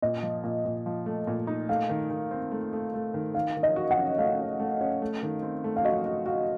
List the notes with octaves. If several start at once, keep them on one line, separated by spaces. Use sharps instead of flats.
A#2 D#5
F3
A#2
A#2
F3
A3
A#2
D#4
A3 F5
D#3
D#3
C4
A3
A3
A3
D#3
D#3 F5
D#3
D#5
F#4
F#5
C#4
A3 F5
C#4
A3
C#4
A3
D#3
C4
A3
F5
F#4 D#5
F#4
F#4 F5